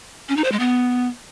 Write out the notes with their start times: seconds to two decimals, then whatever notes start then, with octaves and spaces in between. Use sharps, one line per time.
0.29 C#4
0.37 D#4
0.44 C5
0.52 G#3
0.59 B3